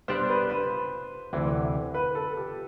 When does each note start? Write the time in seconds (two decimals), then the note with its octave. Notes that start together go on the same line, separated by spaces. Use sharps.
0.08 G3 B3 D4 G4 C5 D5
0.29 B4
0.50 B4
1.33 D2 C3 E3
1.94 B4
2.15 A4
2.37 G4